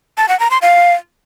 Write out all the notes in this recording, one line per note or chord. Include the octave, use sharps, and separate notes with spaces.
A5
F#5
A#5
C6
F5